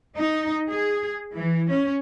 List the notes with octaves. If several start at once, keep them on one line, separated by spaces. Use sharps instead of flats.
D#4
G#4
E3
C#4